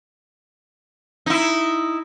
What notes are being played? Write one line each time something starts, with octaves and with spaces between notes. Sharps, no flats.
D#4 E4